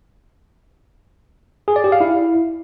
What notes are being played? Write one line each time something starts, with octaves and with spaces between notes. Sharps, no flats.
G#4
D5
G4
F5
E4